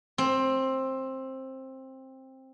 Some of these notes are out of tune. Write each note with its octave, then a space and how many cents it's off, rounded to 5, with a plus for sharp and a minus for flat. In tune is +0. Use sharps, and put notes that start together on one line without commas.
C4 +15